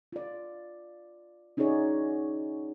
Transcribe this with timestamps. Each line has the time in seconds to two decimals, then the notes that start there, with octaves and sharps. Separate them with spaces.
0.12 F4 D5
1.57 C#4 D#4 F#4 G#4 C#5 D5